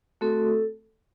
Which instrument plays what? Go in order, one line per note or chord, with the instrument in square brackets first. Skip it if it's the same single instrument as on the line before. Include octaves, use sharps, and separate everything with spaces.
[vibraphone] A3 C4 F#4 A4